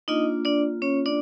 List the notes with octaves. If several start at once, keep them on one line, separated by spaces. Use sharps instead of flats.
A#3 D4 D#4 F4 D#5
D4 D5
C#4 C#5
D4 D5